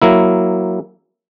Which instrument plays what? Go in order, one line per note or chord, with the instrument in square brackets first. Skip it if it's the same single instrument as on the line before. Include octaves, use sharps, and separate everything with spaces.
[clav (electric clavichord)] F#3 A#3 E4